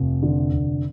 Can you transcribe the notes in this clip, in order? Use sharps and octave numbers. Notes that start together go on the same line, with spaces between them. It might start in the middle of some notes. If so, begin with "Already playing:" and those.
Already playing: F1
D3
F1